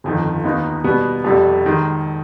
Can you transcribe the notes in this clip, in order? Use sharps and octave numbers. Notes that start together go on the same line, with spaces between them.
G1 F2 D#3
D#2 D#3 B3 D#4
B2 G3 B3
F1 F2 C3 G3
D#3 G#3